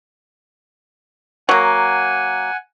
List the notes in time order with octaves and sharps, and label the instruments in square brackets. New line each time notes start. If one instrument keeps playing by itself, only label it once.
[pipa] F#3 A#3 [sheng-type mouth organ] F#5 G#5